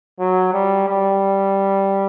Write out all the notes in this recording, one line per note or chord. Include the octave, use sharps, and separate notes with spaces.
F#3
G3
G3